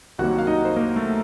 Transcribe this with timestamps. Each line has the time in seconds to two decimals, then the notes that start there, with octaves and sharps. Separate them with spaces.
0.19 C2 C3 D#3 F#3 A#3 F#4 F#5
0.39 F5
0.47 D#4 D#5
0.65 C5
0.77 A#3 A#4
0.96 A3 A4